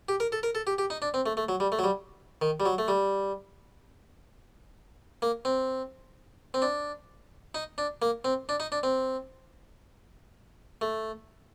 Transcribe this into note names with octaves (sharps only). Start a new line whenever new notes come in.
G4
A#4
A4
A#4
A4
G4
G4
D#4
D4
C4
A3
A3
F#3
G3
A3
F#3
G3
D#3
G3
F#3
A3
G3
A#3
C4
C4
D4
D#4
D4
A#3
C4
D4
D#4
D4
C4
A3